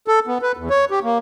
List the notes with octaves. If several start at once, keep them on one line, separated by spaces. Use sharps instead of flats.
A4
B3
B4
E2
C#5
G4
A#3